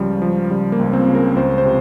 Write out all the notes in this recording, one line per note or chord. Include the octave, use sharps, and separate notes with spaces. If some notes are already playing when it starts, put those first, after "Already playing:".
Already playing: C#2 C#3 F3 G3
F3
C#2 G3
A#3
C#2
C4
C#3
A#4
C#2 C5
C5
C3